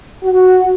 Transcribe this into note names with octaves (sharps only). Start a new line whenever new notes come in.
F#4